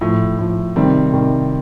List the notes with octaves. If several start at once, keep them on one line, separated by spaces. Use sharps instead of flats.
A2 F3
A2 F3
C3 D#3 G3 C4
C3 D#3 G3